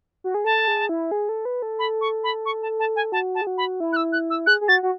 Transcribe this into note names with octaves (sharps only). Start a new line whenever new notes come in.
F#4
G#4
A4 A5
G#4
E4
G#4
A4
B4
A4
B5
C#6
B5
C#6
A5
A5
G#5
F#4 A5
A5
G#4
F#4
B5
E4
F#6
E6
F#6
E6
G#4 F#6
G#4
F#4 A6
F#4